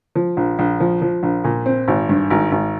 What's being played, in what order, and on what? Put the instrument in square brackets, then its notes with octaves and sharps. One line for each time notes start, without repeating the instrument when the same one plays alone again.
[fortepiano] F3
A#1
A#1
F3
F3
A#1
A#2
C4
G#1
G2
G#1
G#1